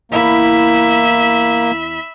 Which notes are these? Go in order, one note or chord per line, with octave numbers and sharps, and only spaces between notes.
E2 A#3 E4 E5 B5